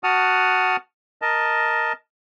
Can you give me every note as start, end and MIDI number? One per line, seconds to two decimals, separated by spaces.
0.04 0.76 66
0.04 0.76 78
0.04 0.76 81
0.04 0.76 87
0.04 0.76 89
1.22 1.93 70
1.22 1.93 75
1.22 1.93 81